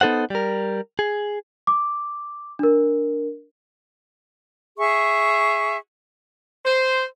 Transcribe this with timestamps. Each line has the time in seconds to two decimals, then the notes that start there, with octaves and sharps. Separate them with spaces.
0.01 B3 D#4 A4 C5 F#5
0.30 G3 A#4
0.99 G#4
1.67 D6
2.59 D4 A#4
4.78 G#4 E5 C#6
6.65 C5